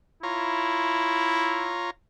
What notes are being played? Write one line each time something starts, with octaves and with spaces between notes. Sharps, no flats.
E4 F4 C#5 A#5